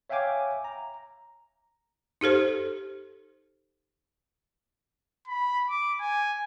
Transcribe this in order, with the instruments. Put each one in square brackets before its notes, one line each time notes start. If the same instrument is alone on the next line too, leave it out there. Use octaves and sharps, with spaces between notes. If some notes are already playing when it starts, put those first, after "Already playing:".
[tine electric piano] C#5 E5 F5 G5 G#5 D6
A#5
[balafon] D#4 G4 A4 C5
[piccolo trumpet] B5
D6
G#5